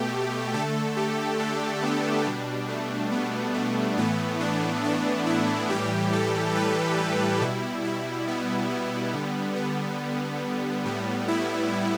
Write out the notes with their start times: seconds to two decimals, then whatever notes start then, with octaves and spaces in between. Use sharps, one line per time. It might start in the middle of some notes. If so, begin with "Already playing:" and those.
Already playing: B2 A3 G4
0.54 D3 A3 A4
0.96 G4
1.39 D4
1.82 B3
2.26 B2 G3 D4
2.68 A3
3.11 B3
3.54 A3
3.97 A2 E3 A3 B3
4.40 D4
4.84 D4
5.26 E4
5.69 A2 E3 G3 G4
6.13 A4
6.55 B4
6.99 A4
7.41 B2 G3 E4
7.85 E4
8.28 B3
8.70 B3
9.14 D3 G3
9.56 B3
10.85 A2 G3
11.28 E4